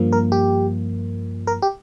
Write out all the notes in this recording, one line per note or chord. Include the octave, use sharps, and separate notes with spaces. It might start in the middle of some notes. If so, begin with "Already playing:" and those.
Already playing: G2 F3 A#3
A#4
G4
A#4
G4